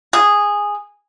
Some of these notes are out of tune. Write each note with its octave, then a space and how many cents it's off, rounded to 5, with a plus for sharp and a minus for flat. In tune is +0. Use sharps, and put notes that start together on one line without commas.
G#4 -10